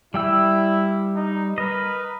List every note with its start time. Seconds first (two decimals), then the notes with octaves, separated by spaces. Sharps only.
0.14 G3 E4 G5 E6
1.15 D#4
1.58 A#4 B4 D#5